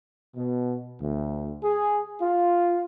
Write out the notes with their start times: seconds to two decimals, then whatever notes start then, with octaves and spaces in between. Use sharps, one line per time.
0.36 B2
1.01 D2
1.64 G#4
2.21 F4